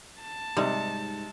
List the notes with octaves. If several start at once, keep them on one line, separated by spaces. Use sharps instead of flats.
A5
G#2 C3 G3 D#4